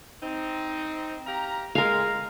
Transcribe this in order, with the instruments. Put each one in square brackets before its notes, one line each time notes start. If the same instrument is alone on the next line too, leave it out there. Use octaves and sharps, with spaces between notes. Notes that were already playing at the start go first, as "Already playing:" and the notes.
[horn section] C4 D#4
G4 F5 A#5
[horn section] G#3 [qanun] A#4 F5